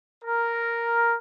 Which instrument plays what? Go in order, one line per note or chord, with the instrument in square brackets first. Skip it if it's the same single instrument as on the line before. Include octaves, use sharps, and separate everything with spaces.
[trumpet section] A#4